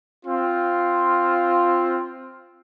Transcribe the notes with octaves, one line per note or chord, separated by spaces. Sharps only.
C4 F4